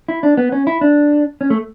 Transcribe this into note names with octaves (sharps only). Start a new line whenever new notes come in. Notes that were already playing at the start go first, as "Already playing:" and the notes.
E4
D4
B3
C#4
E4
D4
C#4
A3